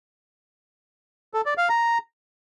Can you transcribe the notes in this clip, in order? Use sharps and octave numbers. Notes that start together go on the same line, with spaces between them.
A4
D5
F5
A#5